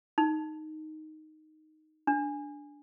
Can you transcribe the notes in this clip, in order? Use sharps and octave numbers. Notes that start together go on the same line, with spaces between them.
D#4
D4